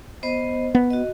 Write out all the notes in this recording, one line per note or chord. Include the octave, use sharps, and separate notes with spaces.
B3 C5 D#5
B3
F#4 D#5